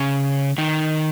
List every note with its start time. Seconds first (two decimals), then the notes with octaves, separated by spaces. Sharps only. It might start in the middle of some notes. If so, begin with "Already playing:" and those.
Already playing: C#3 C#4
0.58 D#3 D#4